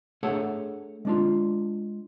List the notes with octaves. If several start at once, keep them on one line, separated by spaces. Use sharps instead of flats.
A3 D4 G#4 A4 C#5 F#5
G#3 D4 F4